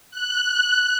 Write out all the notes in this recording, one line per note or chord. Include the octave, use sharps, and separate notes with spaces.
F#6